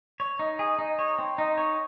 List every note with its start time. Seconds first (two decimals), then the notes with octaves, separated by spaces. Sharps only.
0.20 C#5
0.39 D#4
0.59 G#4
0.79 D#4
0.99 C#5
1.18 C4
1.38 D#4
1.58 C#5